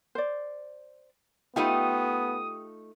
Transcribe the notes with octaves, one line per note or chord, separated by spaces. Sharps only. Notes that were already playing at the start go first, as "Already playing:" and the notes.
C5 D5
A3 B3 D#4 F4 G4 G5 B5 D#6